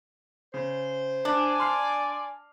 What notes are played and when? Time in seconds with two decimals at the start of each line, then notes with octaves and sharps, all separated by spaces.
0.54 C#3 C5
1.25 D4 D5 G#5
1.60 C6 F6 C7